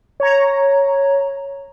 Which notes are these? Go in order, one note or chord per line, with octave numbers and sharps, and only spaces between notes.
C#5 A#5